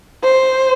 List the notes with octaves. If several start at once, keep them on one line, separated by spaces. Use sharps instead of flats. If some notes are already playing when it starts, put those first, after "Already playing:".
C5